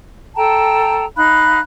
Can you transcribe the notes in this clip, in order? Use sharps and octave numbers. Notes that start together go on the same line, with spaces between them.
A4 G5 A5 A#5
D#4 F5 B5 F#6